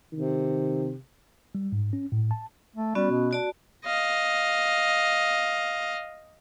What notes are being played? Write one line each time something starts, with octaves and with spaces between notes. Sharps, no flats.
C3 D#3
G3
G#2
C#4
A2
A5
A3
G3 B3 C#4 F#4
B2
F#4 D5 A5
D#5 F5